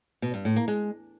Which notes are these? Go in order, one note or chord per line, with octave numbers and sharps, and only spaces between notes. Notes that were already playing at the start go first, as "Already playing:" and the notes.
B2
G2
A2
A#3
G#3